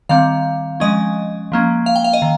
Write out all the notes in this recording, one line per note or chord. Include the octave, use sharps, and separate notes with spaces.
D#3 G3 C4 F5
F3 G#3 C#4 D#5
F3 A#3 C#4
F5
G5
F5
D#5
D#3